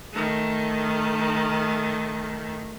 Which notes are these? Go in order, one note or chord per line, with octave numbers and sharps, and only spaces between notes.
D#3 A3